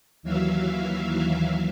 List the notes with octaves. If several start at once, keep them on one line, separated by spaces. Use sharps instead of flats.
D#2 E3 F#3 E5 F5